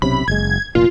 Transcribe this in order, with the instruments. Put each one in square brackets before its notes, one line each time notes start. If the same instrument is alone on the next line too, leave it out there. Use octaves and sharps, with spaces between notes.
[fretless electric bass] B1 C3 C#4 [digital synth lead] B5
[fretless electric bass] F#1 G#3 [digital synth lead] G#6
[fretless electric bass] F1 A#2 [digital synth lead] F4